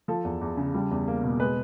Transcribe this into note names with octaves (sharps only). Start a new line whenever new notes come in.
F3 A4
E2
E2
C#3
G3
E2
A#3
B2
G#3 B4